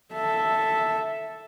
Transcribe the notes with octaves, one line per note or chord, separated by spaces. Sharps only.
A4 E5